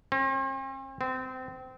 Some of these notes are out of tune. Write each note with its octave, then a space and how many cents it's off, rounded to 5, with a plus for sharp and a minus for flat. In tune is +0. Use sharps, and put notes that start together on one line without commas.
C4 +45
C4 -25